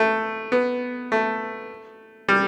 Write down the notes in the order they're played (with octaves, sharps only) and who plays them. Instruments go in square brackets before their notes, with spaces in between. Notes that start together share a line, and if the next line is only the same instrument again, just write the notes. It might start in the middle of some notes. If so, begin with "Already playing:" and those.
Already playing: [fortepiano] A3
B3
A3
G3